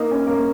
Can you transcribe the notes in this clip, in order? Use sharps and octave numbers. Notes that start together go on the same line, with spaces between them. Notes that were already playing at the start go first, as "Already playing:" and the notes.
Already playing: A#3 D#4
C#4
A#3